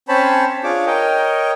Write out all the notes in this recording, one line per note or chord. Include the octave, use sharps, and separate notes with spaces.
C4 C#4 C5 C#5 A5 B5
D4 F4 G#4 C#5 D6
A#4 C#5 D#5 G5